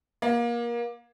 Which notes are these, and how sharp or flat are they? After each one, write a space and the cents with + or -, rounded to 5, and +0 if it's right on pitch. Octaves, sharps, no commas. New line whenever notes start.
A#3 +25